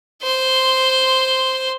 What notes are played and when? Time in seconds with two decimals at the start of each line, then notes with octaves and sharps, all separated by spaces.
0.23 C5 C6